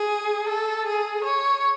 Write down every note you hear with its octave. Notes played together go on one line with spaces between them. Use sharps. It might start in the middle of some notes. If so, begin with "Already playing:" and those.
Already playing: G#4
A4
G#4
C#5